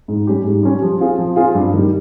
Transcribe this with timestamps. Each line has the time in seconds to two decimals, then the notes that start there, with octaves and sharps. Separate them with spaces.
0.08 G#2
0.27 G3 C#4 G4
0.45 G#2
0.63 G3 C#4 G4
0.82 F3
1.00 C4 F4 G#4
1.18 F3
1.36 C4 F4 G#4
1.55 G2
1.73 D#3 G3